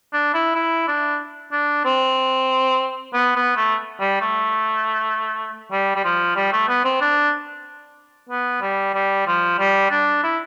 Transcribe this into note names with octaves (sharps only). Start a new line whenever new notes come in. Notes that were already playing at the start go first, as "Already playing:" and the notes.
D4
E4
E4
D4
D4
C4
B3
B3
A3
G3
A3
G3
G3
F3
G3
A3
B3
C4
D4
B3
G3
G3
F3
G3
D4
E4